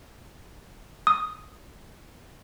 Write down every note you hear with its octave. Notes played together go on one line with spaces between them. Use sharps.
D#6